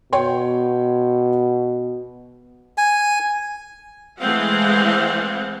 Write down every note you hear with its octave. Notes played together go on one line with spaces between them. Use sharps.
B2 C#5 G5 C6
G#5
E3 G#3 A3 C4 F5 F#5